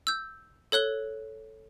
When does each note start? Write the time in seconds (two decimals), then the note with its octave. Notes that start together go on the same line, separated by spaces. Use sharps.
0.07 E6 G6
0.72 A4 C#5 F#6 G7